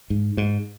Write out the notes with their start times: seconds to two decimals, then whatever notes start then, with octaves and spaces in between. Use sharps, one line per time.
0.10 G#2
0.37 G#2